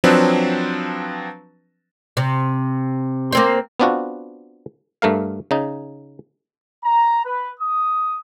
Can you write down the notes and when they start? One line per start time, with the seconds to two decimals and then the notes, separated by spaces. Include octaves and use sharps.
0.04 F3 F#3 C4 D4 B4
2.17 C3
3.32 A#3 C4 C5
3.80 B3 C4 D4 F4 F#4
5.02 G2 A3 A#4 F5
5.51 C#3 D#4
6.84 A#5
7.25 B4
7.60 D#6